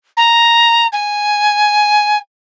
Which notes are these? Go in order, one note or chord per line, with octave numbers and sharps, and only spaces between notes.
A#5
G#5